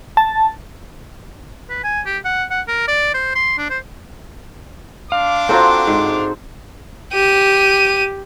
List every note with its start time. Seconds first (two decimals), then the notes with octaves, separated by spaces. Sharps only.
0.17 A5
1.70 B4
1.84 G#5
2.06 G4
2.25 F#5
2.51 F#5
2.68 A#4
2.88 D5
3.14 C5
3.36 C6
3.58 D4
3.70 C5
5.12 D4 F5 C6 D6
5.49 C4 F4 F#4 A4 C5 A#5
5.87 G#2
7.13 G4 D#7